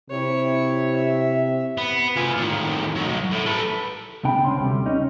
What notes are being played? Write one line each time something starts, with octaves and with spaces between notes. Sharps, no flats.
C3 E4 C#5
E5
B3
F4 G#5
A2 D#3
F#3 D#4
A2
A4 B4
C#2 B2 D4 G5 B5
C2 F2 C4 C#4 C6
D2 C3 G3
C#4 D#4